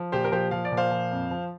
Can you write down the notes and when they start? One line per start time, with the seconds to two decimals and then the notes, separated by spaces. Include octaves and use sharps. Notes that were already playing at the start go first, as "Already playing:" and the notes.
Already playing: F3
0.12 A#2 G4 C5
0.24 A#4
0.32 F3 G4 C5
0.51 F3 F5
0.65 D5
0.72 A#2
0.77 C5 F5
0.91 F3
1.11 F2
1.31 F3